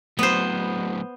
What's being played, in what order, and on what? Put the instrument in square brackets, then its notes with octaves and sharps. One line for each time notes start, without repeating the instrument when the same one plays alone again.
[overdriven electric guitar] A2 F#3 [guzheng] B3 C5